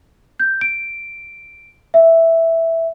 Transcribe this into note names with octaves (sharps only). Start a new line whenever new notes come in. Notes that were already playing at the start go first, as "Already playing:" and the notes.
G6
D7
E5